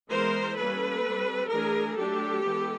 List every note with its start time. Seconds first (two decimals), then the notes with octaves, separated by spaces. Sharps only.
0.10 E3 G#3 B3 A#4 C5
0.57 G3 A#3 C#4 A4 B4
1.03 G3 C4
1.50 E3 A3 D4 G#4 A#4
1.96 F#3 A3 D4 G4 A4
2.42 E3 G#3 B3